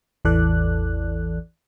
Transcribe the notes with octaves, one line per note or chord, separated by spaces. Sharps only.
A1 E2 E3 A4 D5 F#6